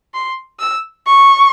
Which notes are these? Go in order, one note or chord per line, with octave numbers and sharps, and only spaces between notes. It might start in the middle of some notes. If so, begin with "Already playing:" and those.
C6
E6
C#6